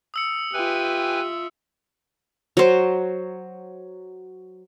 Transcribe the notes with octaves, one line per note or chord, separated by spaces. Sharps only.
D#6 E6 C#7
F4 G4 B4 E5 G#5
F#3 C5